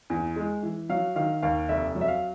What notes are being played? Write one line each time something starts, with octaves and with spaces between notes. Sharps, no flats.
E2
G#3
E3
F#3 F5
D#3 F5
D#2 F5
F1 E5
F#3
E5
F5